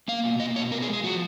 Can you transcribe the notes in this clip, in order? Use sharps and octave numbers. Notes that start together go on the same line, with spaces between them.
A#3 F5
B2
A#3 D#5
B2 C#5
B3 A#4
G#4
G#3
G#4
F3 F#4